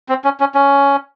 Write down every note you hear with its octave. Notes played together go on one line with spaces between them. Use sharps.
C4
C#4
C#4
C#4